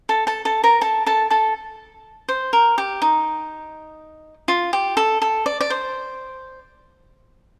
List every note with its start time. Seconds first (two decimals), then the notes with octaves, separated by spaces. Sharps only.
0.09 A4 A5
0.27 A4 A5
0.45 A4 A5
0.64 A#4 A#5
0.81 A4 A5
1.06 A4 A5
1.30 A4 A5
2.28 C5
2.53 A#4
2.78 G4
3.02 D#4
4.48 F4
4.73 G4
4.97 A4
5.22 A4
5.46 D5
5.61 D5
5.70 C5